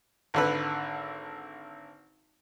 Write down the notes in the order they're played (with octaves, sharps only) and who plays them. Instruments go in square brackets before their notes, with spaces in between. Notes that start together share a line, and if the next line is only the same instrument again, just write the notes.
[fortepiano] G#1 D3 B4